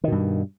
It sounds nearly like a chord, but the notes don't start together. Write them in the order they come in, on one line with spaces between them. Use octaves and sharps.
D#3 B2 G2